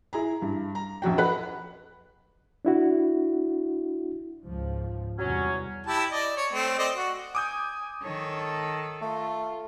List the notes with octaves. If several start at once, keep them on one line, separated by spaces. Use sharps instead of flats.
E4 G#4 A#5
G2
A#5
A#1 F2 F#4 G5
B4 F#5
D4 E4 F#4
C#2 G#2 F3
E2 C3 F#3 G3 C#4
E4 G4 A5
D5 D#5
C#5
A3 C4
C4 D5 D#5
F#4
G#5 D6 D#6 G6
D#3 A4 C#5 A5
A3 F4